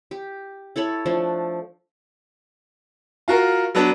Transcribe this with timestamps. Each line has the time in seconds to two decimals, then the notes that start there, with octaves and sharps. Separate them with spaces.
0.11 G4
0.76 E4 A4 C#5 B5
1.06 F3 A3 D4
3.28 F4 F#4 A#4
3.75 F#3 B3 D4